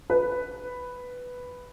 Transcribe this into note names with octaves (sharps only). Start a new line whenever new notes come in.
B4